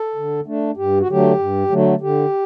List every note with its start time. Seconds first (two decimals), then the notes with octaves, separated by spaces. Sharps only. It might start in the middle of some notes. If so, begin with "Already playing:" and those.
Already playing: A4
0.16 D3
0.46 A3 D4
0.77 G2 G4
1.00 F#4
1.09 D3 F#3 A3 G4
1.39 G2
1.70 D3 F#3 A3
2.01 D3 G4